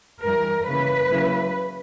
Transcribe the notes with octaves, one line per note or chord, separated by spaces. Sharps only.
G2 E3 G3 A#4
C#3 E3 A#3 B4
C#3 F#3 A#3 E4